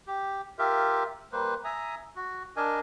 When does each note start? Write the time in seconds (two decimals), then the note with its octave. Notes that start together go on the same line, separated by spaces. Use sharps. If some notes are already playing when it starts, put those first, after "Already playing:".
0.07 G4
0.59 F4 G4 A#4 E5
1.32 G3 A#3 B4 C5
1.64 E5 G#5 A#5 D#6
2.16 F#4
2.56 D4 A#4 D#5 G#5